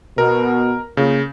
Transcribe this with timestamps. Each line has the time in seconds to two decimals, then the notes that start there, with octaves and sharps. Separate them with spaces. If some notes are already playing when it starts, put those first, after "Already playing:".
0.18 B2 A#4
0.97 C#3 A#3 F4